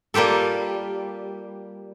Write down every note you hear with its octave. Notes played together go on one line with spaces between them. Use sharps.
G3 A#3 F4 G4 A4